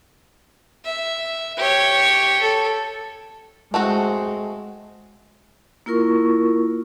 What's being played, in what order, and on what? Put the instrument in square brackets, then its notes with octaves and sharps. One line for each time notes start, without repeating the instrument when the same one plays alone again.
[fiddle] E5
G4 C#5
A4
[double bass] G#3 [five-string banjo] A3 C4 F#4
[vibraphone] A#3 E4 F4 A#4 C#6